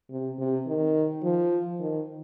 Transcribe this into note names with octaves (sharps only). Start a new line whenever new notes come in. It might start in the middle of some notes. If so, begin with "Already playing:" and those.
C3
C3
D#3
F3
D#3